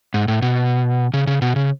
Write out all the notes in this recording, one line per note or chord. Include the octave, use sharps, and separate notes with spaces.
G#2
A2
B2
C#3
C#3
B2
C#3